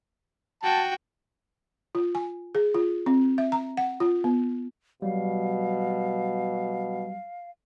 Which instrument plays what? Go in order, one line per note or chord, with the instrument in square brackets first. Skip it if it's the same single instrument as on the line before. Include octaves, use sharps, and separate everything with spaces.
[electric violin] F#4 G5 [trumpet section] A5
[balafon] F4
G#5
G#4
F4
C4
E5
A#5
F#5
F4
B3
[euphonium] B2 [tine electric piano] F#3 G3 [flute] F5